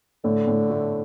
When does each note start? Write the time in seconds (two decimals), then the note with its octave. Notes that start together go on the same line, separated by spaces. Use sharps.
0.24 A2 D3
0.47 A2
0.70 A3